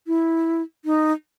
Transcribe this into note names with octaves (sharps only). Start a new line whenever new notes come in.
E4
D#4